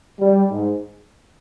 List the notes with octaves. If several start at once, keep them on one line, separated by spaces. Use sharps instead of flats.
G3
G#2